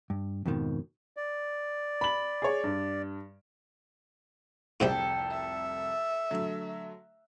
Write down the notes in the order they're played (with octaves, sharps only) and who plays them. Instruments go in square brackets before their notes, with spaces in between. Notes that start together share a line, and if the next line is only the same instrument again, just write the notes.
[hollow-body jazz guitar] G2
F2 G#2 B2 D#3 F3
[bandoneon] D5
[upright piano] B5 F#7
G#4 C#5
G2
[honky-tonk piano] F1 C2 [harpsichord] G#2 C3 G3 [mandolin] A4 G5
[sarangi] E5
[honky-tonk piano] D3 F#3 A3